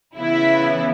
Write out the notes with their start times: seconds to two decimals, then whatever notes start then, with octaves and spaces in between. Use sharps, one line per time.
0.17 C#3 E3 B3 E4